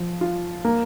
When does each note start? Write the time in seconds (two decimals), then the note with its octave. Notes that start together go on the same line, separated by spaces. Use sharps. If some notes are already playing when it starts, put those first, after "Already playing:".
Already playing: F3
0.21 F4
0.65 A#3